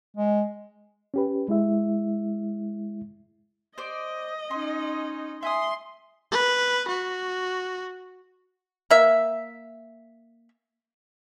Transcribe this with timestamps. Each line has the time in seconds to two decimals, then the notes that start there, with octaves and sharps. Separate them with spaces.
0.17 G#3
1.14 C#4 G4 B4
1.48 G#3 E4 E5
3.78 C5 D5 D#5
4.51 C#4 D#4 C6
5.43 E5 G#5 C6 D#6
6.32 B4
6.88 F#4
8.90 A#3 E5